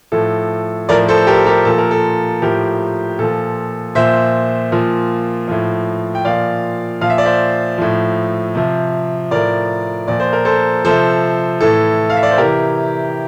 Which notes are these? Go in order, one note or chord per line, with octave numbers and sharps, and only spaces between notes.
A2 F3 A4
A2 F3 A#4 D5
A4 C5
G4 A#4
G4 A#4
A#2 F3 A4
A#4
A4
A2 F3 G4 A#4
A#2 F3 A4
A#2 F3 C5 E5
A#2 F3
A2 F3
G5
A#2 F3 D5 F5
A#2 F3 F5
E5
D5
C5 E5
A2 F3
C3 F3
A2 F3 A#4 D5
A#2 F3 D5
C5
A#4
A4 C5
C3 F3 A4 C5
A2 E3 A4
F5
E5
D5
C5
C3 E3 G4 A#4